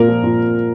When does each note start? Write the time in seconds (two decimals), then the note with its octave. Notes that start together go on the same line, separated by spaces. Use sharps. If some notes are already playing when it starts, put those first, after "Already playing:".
Already playing: A#2 A#3 A#4
0.08 F3
0.24 A#2